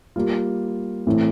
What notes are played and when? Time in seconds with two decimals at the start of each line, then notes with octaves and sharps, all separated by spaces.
0.16 G3 A#3 F4
1.07 A2 E3 A3 C4